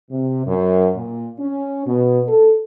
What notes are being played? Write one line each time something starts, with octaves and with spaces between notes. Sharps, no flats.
C3
F#2
A#2
C#4
B2
A4